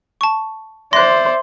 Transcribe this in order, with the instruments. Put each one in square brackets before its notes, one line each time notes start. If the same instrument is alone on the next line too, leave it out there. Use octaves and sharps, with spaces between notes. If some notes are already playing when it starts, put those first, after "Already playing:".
[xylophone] A5 C#6
[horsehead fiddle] C5 D5 [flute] E5 [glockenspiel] C6 [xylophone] F#6 A#6